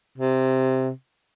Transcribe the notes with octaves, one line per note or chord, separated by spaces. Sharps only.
C3